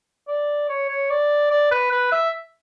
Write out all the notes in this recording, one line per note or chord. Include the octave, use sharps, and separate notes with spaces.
D5
C#5
C#5
D5
D5
B4
B4
E5